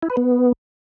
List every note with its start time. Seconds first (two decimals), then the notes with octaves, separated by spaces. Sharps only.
0.03 E4
0.10 B4
0.17 B3